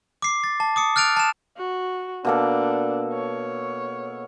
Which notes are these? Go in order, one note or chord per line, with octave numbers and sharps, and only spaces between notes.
D6 C7
A6
A5
D6 D#6 C#7
F6 F#6 A6 D7 F7
A5 E7
F#4
B2 A#3 D4 A4
C#5